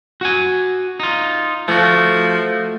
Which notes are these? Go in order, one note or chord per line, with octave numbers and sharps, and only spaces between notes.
F#4 F#5 G#5
D#4 F4
F3 A3 F#4